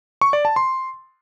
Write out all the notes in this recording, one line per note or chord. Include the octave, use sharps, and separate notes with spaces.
C#6
D5
A5
C6